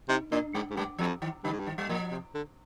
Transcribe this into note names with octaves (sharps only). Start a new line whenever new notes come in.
C3 D#4
A#2 D4
G#2 G#3
G#2
G2 G#3
F2 F3
D#3
G2 D3
G#2
G2
D#3
G3
A#2 F3
C3
D3